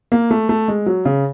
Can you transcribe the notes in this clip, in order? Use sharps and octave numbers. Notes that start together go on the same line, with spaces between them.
A#3
A3
A3
G#3
F#3
C#3